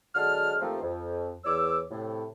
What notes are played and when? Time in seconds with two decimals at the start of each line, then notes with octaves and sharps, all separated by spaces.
0.15 D3 F#3 G#3 A5 F6
0.60 D#2 C3 F3 A3 A#3 C4
0.82 F2
1.44 E2 C#5 D6 E6
1.90 A2 C3